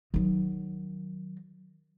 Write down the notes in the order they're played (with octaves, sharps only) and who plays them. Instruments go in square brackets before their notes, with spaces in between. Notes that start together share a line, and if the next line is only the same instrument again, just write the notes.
[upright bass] D#3 F#3